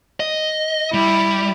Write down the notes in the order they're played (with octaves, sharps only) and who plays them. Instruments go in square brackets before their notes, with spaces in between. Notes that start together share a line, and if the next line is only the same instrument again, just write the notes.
[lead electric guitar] D#5
[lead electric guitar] G3 [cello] E4